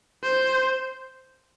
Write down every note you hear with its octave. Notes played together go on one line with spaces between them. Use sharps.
C5